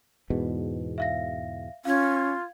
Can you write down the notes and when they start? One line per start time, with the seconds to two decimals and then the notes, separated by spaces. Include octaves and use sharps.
0.30 E2 G#2 B2
0.98 E5 F5 A#6
1.85 C#4 F4 F5 G#6